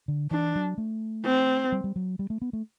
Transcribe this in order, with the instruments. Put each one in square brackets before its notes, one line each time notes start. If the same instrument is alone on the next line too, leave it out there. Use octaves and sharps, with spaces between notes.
[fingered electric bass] D3
[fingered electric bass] E3 [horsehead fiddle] D4
[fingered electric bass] F#3
A3
[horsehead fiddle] C4
[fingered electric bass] G3
G3
F#3
G3
A3
B3
A3